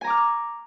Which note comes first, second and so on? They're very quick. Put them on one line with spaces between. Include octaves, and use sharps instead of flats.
G#5 A#5 D6 F6